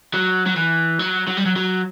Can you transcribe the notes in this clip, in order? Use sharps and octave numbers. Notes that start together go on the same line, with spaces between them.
F#3
F#3
E3
F#3
F#3
G3
F#3
F#3